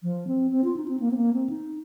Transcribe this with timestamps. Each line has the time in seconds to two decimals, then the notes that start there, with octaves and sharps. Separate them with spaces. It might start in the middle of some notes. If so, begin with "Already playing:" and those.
0.03 F3
0.27 C4
0.51 C4
0.64 F4
0.77 D#4
0.88 C4
1.00 A#3
1.11 C4
1.17 A#3
1.33 C4
1.49 D#4